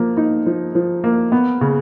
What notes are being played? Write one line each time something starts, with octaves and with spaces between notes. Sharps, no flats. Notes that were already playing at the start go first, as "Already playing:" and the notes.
Already playing: F3 A#3
D#4
F3
F3
A#3
B3
C#3